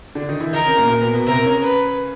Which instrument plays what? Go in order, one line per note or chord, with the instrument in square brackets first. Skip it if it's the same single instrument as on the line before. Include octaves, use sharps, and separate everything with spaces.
[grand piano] D3 D4
D#3 D#4
E3 E4
[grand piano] D#3 D#4 [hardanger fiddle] A#4
[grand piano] C#3 C#4
A#2 A#3
A#2 A#3
B2 B3
B2 B3
[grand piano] C3 C4 [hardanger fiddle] A#4
[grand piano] C#3 C#4
[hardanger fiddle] B4